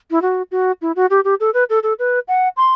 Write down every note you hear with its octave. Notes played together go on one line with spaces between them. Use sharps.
E4
F#4
F#4
E4
F#4
G4
G4
A4
B4
A4
A4
B4
F#5
C6